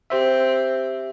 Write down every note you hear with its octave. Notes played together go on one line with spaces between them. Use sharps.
C4 G4 C5 E5